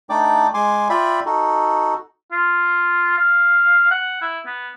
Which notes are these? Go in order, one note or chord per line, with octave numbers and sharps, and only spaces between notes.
A3 D4 D#4 D5 G5 D6
G#3 G#5 C6 D6
F4 D5 E5 G5 B5
D#4 F#4 A4
F4
F5
F#5
E4
B3